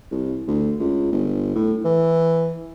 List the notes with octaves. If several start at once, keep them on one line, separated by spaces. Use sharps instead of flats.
C2
D2
C#2
G1
A2
E3